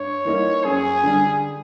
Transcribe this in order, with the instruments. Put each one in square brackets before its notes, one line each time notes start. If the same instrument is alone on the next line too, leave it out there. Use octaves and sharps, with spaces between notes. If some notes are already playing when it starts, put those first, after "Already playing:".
Already playing: [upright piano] G2 [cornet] C#5
[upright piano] E3 G3 A#3 D#4
[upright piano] F#2 [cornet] G#4
[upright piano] D3 G3